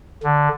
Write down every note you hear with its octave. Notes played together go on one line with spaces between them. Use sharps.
D3